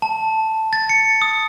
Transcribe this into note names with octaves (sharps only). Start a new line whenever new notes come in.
A5
A6
C#7
D#6